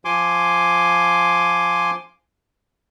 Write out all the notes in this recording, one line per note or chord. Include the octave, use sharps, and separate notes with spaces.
F3 G#5 C6 D6